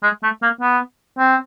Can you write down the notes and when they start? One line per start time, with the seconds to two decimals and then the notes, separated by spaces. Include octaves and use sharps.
0.03 G#3
0.23 A3
0.42 A#3
0.61 B3
1.18 C4